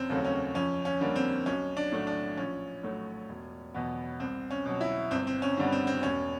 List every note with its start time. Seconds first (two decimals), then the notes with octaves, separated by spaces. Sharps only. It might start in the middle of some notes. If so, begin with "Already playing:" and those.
Already playing: F1 C4 C#4
0.09 D#2 C#3 F#3 A3
0.24 C#4
0.55 F2 C#4
0.85 C#4
1.01 D3 G3 A#3
1.16 C4
1.46 B1 C#4
1.77 D4
1.92 A2 F#3 A3
2.07 D4
2.37 A#1 C#4
2.83 A2 F#3 A3
3.29 E1
3.74 E2 B2 F#3 B3
4.20 C2 C4
4.50 C#4
4.65 B2 F#3
4.81 E4
5.11 G1 C4
5.27 C4
5.42 C#4
5.57 G2 D3 G3 B3
5.72 C4
5.87 C4
6.02 E1 C#4